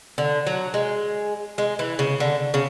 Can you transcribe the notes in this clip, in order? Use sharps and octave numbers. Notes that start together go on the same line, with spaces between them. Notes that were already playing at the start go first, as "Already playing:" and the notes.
D3
F#3
G#3
G#3
E3
C#3
D3
C#3